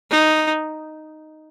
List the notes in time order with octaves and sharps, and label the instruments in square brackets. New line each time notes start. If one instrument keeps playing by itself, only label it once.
[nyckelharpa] D#4